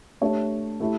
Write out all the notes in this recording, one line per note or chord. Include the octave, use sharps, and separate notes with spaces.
A3 D4 G4 C#5
A3 E4 G4